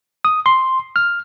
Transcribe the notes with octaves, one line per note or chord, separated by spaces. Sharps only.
D#6
C6
F6